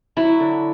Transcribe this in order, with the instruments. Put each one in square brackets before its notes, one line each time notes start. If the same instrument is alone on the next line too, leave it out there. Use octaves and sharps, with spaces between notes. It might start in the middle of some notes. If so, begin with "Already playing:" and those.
[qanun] F#3 E4
D3